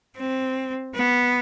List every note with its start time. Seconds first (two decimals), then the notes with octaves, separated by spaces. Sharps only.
0.17 C4
0.95 B3